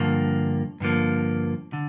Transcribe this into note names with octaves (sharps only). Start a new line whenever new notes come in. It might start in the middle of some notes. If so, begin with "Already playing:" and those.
Already playing: G2 D3 F3 A#3
G2 D3 F3 A#3
D3